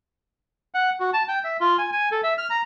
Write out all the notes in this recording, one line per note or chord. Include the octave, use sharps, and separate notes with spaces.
F#5
F#4
A5
G5
E5
F4
G#5
G#5
A4
E5
F6
A#5